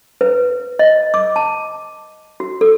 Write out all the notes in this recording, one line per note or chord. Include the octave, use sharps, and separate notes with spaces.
B4
D#5
D6
A5
F#4
A4